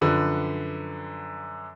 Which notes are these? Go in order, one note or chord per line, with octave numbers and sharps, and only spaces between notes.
F#2 D3 F3 B4